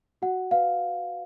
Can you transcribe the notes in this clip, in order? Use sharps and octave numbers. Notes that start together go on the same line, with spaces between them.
F#4 F#5
B4 F5